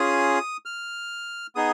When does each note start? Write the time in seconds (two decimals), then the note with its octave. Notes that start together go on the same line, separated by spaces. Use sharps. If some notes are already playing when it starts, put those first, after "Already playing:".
Already playing: C#4 F4 G#4 D#6
0.65 F6
1.56 B3 D#4 G#4 D#6